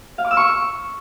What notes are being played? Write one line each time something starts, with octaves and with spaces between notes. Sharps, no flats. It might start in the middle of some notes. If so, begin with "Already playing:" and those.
F5
D6
E6
C#6
E6